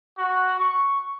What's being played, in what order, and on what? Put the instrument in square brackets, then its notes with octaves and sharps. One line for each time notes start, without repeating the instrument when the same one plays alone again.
[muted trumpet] F#4
C#6